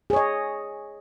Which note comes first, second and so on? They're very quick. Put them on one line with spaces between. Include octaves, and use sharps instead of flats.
G#4 C#5 D#5